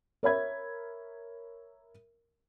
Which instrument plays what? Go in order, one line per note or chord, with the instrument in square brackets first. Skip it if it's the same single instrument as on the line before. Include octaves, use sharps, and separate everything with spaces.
[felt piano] A#4 C#5 E5 B5 G#6